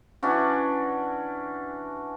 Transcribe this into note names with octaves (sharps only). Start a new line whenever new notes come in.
E3 C#4 D4 F#4